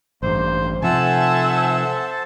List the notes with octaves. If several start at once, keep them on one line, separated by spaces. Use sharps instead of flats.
A1 G2 A#3 C5
C3 F3 A4 C5 E5 F#5 G#5 A5